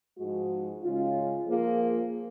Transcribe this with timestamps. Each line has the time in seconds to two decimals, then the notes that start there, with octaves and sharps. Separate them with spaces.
0.18 G#2 F3 G#3 D#4 F#4
0.82 C#3 G#3 C#4 F4
1.46 F3 A#3 F4 G#4